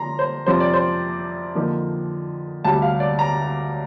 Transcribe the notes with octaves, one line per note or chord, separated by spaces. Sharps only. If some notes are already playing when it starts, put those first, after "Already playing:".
Already playing: D3 F3 A#5 C6
C5
F2 C3 F3 C4 C5
D5
C5
F2 D3 F3 A#3 D#4
D2 C3 G3 A5
F5
D5
A#5